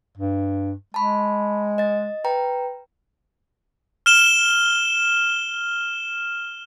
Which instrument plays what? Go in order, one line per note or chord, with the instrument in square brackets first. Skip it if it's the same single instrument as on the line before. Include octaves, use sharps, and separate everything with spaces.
[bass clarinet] G2
[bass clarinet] G#3 [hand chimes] A5 B5 C#6
[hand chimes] D#5 A6
B4 G5 A#5
[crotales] F6 E7 G7